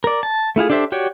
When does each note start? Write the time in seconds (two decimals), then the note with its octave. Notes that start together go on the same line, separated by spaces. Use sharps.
0.04 A#4 D5
0.23 A5
0.56 A3 E4 F4 G#4
0.70 D4 G4 A4 C5 E5
0.92 F#4 G4 C#5 D5